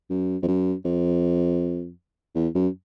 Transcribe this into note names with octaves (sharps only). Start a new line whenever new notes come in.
F#2
F2
F#2
F2
E2
F#2